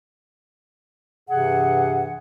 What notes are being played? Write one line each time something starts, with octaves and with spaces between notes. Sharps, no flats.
G2 C3 E3 G#4 F#5